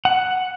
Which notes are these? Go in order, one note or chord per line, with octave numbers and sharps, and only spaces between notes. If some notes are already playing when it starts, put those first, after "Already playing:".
F#5